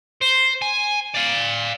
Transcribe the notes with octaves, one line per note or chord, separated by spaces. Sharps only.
C5
G#5
D5 F5